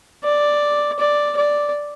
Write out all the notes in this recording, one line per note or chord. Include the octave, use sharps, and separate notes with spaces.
D5
D5
D5